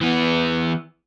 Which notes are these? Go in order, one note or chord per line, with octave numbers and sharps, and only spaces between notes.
E3 B3